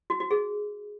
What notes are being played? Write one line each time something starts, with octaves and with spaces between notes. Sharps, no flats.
F#4
F#4
G#4